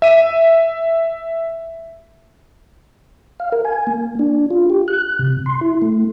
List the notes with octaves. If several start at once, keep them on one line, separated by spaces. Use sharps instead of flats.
E5 D#7
F5
A#4
G#5
A#3
D4
F4
G4
F#6
C3
C6
E4
A3